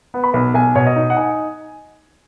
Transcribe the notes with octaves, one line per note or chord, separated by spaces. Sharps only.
B3
B5
B1
B1 G#5
B2 C#5
D#5
D#4
F#5
D#4 G#5